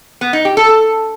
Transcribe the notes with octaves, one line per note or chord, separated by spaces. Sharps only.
B3
D#4
G4
A4
A4